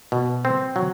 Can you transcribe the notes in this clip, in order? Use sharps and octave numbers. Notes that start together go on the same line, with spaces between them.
B2
C4
F#3